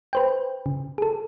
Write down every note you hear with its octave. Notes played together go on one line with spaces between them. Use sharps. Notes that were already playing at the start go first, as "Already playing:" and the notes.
B4 C5 G5
C#3
G#4 A4